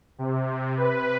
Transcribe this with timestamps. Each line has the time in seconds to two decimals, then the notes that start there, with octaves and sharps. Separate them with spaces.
0.19 C3
0.77 B4